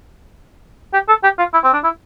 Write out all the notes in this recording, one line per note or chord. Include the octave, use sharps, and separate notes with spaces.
G4
A4
G4
F4
E4
C4
D4
E4